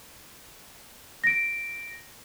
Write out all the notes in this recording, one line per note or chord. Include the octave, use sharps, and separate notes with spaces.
A#6 D7